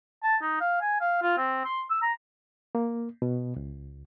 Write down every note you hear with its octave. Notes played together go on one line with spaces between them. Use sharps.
A5
D#4
F5
G#5
F5
F4
C4
C6
E6
A#5
A#3
B2
C#2